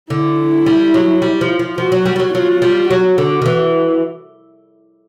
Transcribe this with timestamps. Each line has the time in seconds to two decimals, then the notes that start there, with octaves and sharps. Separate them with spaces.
0.10 D3 E4
0.66 G3
0.94 F#3
1.22 G3
1.41 F3
1.59 F3
1.78 F3 F#4
1.92 F#3
2.06 G3
2.16 G3
2.20 F#3
2.34 F#3 F4
2.62 G3
2.90 F#3 F#4
3.18 D3
3.42 D#3
3.46 E3